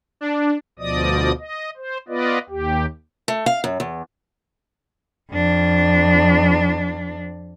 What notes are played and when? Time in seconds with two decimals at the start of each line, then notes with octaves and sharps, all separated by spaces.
0.21 D4
0.79 D2 B2 F3 D5 D#5 D#6
1.39 D#5
1.77 C5
2.08 B3 F4 B4 D5 D#5
2.49 D#2 G4
3.28 A3
3.46 F5
3.64 F#2
3.80 E2
5.31 F2 D4